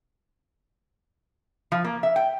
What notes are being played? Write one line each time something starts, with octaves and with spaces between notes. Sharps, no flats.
F3
A#3
E5
G5